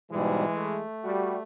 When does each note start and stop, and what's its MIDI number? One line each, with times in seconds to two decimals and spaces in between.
0.12 0.45 44
0.12 0.45 47
0.12 0.83 52
0.12 0.45 55
0.12 0.83 56
0.52 1.43 57
1.04 1.38 55
1.04 1.38 66